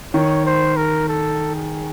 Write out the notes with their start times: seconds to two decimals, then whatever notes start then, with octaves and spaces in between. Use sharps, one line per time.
0.14 D#3 C#5
0.46 C5
0.76 A#4
1.08 A4
1.55 G#4